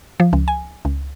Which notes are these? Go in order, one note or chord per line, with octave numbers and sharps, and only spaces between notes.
F3
C#2
G#5
C#2